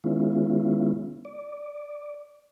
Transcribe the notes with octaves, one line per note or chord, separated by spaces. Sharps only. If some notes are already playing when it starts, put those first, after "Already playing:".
D#3 G#3 B3 C#4 E4 F4
D5